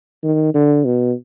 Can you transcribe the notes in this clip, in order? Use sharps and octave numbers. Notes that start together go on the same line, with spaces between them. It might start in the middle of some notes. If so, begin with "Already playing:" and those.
D#3
D3
B2